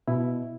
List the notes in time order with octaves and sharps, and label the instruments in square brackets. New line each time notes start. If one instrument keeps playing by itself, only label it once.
[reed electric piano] B2 E4